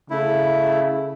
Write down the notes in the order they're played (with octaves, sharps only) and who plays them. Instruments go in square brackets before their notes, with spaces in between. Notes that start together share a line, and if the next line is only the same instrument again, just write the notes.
[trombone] C#3 [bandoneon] A3 E4